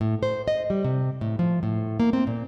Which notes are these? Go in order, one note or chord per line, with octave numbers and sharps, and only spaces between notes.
A2
C5
D#5
G3
C3
A2
F3
A2
A#3
C4
A#2